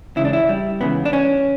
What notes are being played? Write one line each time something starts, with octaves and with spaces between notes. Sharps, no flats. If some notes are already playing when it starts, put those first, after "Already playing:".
C#2 C#3 E3 E4
D4
E4
G3
C#2 C#3 E3 B3
D4
C#4